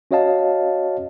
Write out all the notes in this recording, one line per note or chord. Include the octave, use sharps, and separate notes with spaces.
C#4 F#4 C#5 D#5 F5 A5